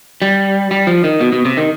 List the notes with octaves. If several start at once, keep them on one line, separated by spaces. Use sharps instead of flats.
G3
G3
F3
D#3
B2
B2
C3
D#3